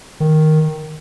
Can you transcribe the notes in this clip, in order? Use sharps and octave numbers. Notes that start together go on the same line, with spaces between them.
D#3